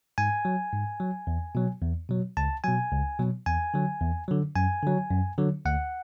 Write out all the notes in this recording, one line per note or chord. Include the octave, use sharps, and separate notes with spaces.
G#2 G#5
F#3
G#2
F#3
E2
B2 F#3
E2
B2 F#3
C#2 A5
B2 F#3 G#5
C#2
B2 F#3
E2 G#5
D3 F#3
E2
D3 F#3
F#2 G#5
D3 F#3
F#2
D3 F#3
D2 F#5